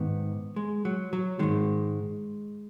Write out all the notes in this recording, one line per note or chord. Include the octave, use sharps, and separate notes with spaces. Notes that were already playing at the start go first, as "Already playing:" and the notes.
Already playing: G#2 D#3 B3
G#3
F#3
F#3
G#2 D#3 G#3